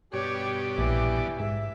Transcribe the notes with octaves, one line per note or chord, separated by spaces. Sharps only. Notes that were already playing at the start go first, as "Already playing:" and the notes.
G2 B2 G4 C#5 D5
A#1 E3
G#2 E5